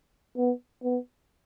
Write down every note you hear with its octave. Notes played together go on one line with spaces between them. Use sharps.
B3
B3